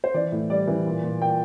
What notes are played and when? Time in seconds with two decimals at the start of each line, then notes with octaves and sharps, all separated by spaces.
0.04 C5
0.14 E3 D5
0.32 A2
0.50 G3 D5
0.67 E3
0.86 A#2
1.03 A#2
1.20 A#2 G5